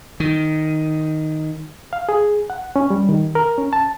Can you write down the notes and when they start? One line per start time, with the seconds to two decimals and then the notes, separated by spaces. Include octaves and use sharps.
0.20 D#3
1.93 F5
2.09 G#4
2.50 F#5
2.76 C#4
2.90 G3
3.09 D#3
3.35 A#4
3.58 C#4
3.73 A5